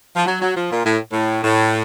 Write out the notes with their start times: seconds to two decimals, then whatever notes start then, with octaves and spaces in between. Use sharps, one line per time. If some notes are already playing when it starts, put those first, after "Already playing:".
0.15 F3
0.26 F#3
0.41 F#3
0.55 F3
0.71 A#2
0.85 A2
1.11 A2
1.44 A2